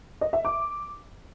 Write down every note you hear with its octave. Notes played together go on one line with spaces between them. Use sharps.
D#5
E5
D6